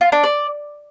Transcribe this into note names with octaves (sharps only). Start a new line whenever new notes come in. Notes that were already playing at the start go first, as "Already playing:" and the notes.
F4
D4
D5